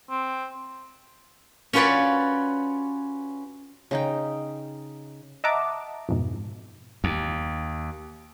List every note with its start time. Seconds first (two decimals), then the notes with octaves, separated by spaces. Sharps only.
0.10 C4
1.73 C#4 F4 F#4 B4 C#5 D5
3.91 C#3 D#4 G5
5.44 D#5 E5 F#5 A5 A#5 D6
6.09 F2 G#2 B2
7.04 D#2